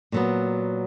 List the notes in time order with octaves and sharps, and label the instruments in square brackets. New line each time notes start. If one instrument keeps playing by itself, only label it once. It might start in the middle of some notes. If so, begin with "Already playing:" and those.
[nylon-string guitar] A#2 F#3 B3